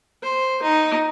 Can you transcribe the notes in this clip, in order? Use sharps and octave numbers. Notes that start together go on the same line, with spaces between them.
C5
D#4